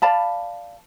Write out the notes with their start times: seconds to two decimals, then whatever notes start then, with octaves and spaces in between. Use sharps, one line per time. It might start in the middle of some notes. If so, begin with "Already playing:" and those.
0.02 D5 F5 A5 B5